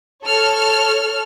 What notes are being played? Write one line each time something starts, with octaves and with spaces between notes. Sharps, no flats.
A4 C#5 F6